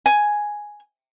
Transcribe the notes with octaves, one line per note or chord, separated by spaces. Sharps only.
G#5